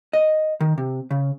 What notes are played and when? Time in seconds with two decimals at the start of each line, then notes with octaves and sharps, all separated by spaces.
0.13 D#5
0.60 D#3
0.78 C3
1.11 C#3